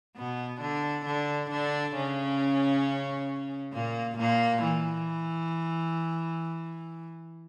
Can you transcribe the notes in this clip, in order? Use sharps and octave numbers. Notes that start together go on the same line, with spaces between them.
B2 B3
D3 D4
D3 D4
D3 D4
C#3 C#4
A#2 A#3
A#2 A#3
E3